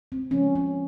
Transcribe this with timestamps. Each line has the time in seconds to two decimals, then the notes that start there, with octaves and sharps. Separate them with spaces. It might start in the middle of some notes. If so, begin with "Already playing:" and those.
0.12 C4
0.31 C#3 F3 G#3 C#4
0.55 C#4